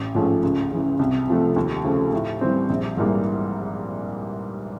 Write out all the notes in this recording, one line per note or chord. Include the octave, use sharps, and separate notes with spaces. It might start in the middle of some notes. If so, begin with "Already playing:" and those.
Already playing: A1
G#2 F3 A3 C#4
C#2
C#3 E3
C2
C3 F3 A3
D#2
C#3 F3 A3 C4
A2
E3 G3 C4
A#1
G#2 E3 G3 A#3